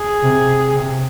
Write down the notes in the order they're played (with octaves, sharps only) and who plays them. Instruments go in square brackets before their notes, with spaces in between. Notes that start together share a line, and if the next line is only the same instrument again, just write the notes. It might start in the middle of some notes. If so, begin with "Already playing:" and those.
Already playing: [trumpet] G#4
[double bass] C3
C3